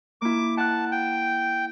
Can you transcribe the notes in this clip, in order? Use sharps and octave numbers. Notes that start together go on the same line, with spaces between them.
A#3 E4 D6
F#5 A5 F#6
G5